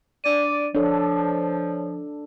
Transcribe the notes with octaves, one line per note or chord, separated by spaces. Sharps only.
D4 D5 D#7
F3 D4 A4 C#5